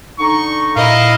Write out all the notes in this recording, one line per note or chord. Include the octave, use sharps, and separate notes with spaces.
D3 D#4 C#6
A#2 E4 D#5 F5